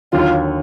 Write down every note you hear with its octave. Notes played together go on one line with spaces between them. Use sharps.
D#2 D3 F#3 F4